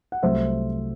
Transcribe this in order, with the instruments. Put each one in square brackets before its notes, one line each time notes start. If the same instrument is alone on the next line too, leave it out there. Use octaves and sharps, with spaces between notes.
[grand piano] F#5
C2 C3 F#3 A3 C5 E5